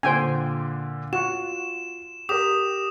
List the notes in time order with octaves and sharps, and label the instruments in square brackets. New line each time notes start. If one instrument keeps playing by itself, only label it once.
[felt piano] A#2 D3 [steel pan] C5 G5 G#5
[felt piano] F4 [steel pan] F#4 [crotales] E7
[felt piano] G4 A#4 [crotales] D#6 E7